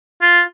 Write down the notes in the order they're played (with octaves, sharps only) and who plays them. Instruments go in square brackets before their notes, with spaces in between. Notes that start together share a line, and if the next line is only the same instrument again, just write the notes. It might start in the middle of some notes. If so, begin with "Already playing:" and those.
[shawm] F4